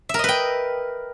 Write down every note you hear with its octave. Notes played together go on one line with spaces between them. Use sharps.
A#4 B4 D#5 E5 G5